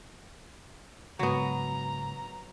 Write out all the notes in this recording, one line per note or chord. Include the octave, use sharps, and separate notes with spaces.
G#2 C#3 F#3 B3 A#5